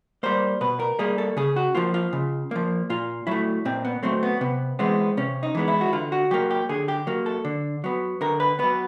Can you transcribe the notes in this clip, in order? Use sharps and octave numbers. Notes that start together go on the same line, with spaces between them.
G3 A#3 C5
B2 B4
A#4
G3 A#3 G#4
A4
C#3 G#4
F#4
F3 A#3 F4
F4
C#3
F3 A#3
A#2 F4
F#3 A3 E4
A#2 C4
B3
F#3 A3 C4
B3
C3 B3
E3 G#3 B3 C4
C3 C#4
D#4
E3 G#3 B3
E4
F#4
D3 F4
F#4
F#3 A#3 G4
G4
D3 G#4
G4
F#3 A#3
A4
D3
F#3 B3
D3 A#4
B4
F#3 B3 B4